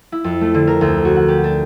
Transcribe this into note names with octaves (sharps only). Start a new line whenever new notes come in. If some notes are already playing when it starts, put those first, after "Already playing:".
E4
F2
A3
D3
A#4
D2
F#4
F#5
G4
D4